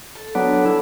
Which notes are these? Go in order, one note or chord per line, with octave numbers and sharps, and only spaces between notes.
A4
F#3 B3 D4
E4